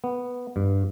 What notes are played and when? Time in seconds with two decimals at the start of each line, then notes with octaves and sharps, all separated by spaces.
0.04 B3
0.56 G2